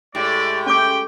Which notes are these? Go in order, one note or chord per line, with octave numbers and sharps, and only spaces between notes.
A2 G#3 A3 G4 D5
C#4 G5 D6